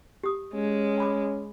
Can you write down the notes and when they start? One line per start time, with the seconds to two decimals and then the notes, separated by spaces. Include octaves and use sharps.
0.24 G4 D#6
0.54 G#3 C#4
0.98 G#5 B5 D6